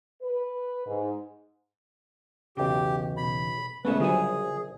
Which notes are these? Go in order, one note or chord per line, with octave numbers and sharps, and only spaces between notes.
B4
G#2
B1 E2 C#3 G4 G5
B2 B5
A#1 C#3 G#3 A3 B3 C#4 A4 B4
D3 F#3 G3 F4 G#4 C5 G#5